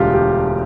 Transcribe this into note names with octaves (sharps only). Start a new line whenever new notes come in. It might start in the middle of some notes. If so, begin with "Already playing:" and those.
Already playing: E1 D2 D3 G3 F4 G4
G4